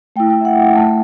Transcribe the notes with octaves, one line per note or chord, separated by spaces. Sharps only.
A3 E4 G5
G5
E5
F#5
G5
A3 E4 A5